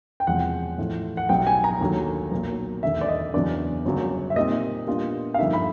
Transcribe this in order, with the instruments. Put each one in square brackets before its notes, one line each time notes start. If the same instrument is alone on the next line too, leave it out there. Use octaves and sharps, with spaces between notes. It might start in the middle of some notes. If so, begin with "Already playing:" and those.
[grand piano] G5
E1 E2 C3 F3 G#3 F#5
A1 A2 F3
F#5
B1 B2 G3 G5
G#5
A#5
D#2 D3 F#3
B1 A#2 F#3
E1 D#2 D3 E5
D5
D#5
E2 C#3 F#3 B3 D4 D5
G1 F#2 C#3 F#3 A#3
E5
A#2 G3 C4 D#4 D#5
A#2 G3 B3 D4 F4
F5
G2 D3 F3 A#3 D#4 E5
B5